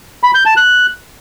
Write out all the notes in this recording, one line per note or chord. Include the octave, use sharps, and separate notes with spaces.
B5
G6
A5
F#6